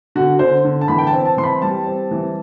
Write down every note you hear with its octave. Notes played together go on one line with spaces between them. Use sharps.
D3 F#4
D3 C5
D3
A5
E3 B5
G5
A5
C4
A5
E3 C6
B5
G3 A5
C4
E3